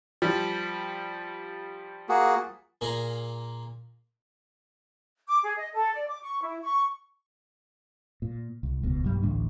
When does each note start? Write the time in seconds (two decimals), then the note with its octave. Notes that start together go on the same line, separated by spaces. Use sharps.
0.22 F3 G3
2.09 A#3 F#4 G#4
2.81 A#2 A#3 G#4 A#5
5.27 D6
5.43 G#4
5.56 D#5
5.74 A4
5.93 D5
6.07 D6
6.21 C#6
6.42 E4
6.62 C#6
8.22 A#2
8.63 C2
8.83 D#1 C#2 B2
9.04 B1 G2 G3 A#3
9.22 A1 D2 A2 D4